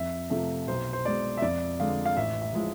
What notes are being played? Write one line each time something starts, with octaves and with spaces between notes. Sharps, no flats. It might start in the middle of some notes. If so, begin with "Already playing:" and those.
Already playing: F2 E5
C3 F3 A3 E5
B1 C5
C5
B2 G#3 D5
E5
F2 D5
D3 G#3 F5
F5
A1 E5
E5
A2 F3 G#3